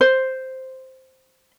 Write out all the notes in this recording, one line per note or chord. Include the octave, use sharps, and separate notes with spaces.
C5